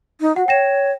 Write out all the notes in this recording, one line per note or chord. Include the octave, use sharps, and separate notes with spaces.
D#4
F#4 F#5
C#5 G5 A#6 E7